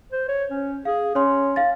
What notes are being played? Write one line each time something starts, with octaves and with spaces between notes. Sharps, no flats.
C5
C#5
C#4
G#4 F5
C#4 C#5 C6
F5 A6